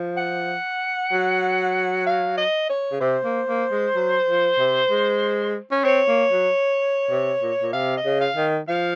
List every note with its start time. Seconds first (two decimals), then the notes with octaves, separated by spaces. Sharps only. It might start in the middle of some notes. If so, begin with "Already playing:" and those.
Already playing: F3
0.17 F#5
1.12 F#3
2.06 F5
2.37 D#5
2.70 C#5
2.91 C#3
3.01 C3 C5
3.25 A#3
3.48 A#3
3.71 G#3
3.95 F#3
4.27 F3
4.59 C3
4.90 G#3
5.72 C#4
5.84 C4 C#5
6.08 A#3
6.32 F#3
7.10 C3
7.42 A#2
7.62 A#2
7.73 C3 F5
7.97 D#5
8.05 C#3
8.21 F5
8.36 D#3
8.68 F3 F5